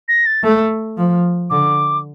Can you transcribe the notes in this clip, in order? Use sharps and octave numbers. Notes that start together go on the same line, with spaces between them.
A#6
A6
A3
F3
D3 D6